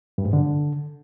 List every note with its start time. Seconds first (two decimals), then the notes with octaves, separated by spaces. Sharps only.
0.18 G2
0.26 G#2
0.33 D3